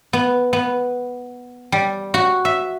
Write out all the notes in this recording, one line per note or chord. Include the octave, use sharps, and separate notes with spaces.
B3
B3
G3
F#4
E5